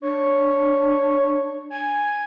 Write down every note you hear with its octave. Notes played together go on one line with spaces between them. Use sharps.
D4 C#5
G#5